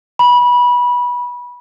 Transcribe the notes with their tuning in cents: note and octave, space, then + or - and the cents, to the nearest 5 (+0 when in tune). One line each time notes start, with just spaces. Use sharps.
B5 -20